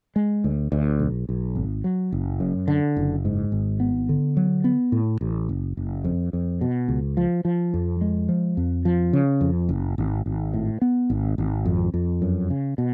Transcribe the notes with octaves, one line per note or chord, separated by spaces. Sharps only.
G#3
D2
D2
B1
B1
G#1
F#3
F#1
F#2
D3
F#1
G#2
G#1
B3
D3
F#3
B3
A2
A1
F#1
F#1
F2
F2
B2
C#2
F3
F3
F2
G#3
F3
F2
F3
C#3
F2
F#1
G#1
G#1
A2
B3
G#1
G#1
F2
F2
F#2
C#3
B2